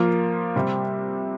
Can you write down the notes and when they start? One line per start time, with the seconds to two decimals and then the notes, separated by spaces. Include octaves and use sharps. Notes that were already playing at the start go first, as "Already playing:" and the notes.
Already playing: F3 A#3 F4 A#4
0.56 C3 G3 C4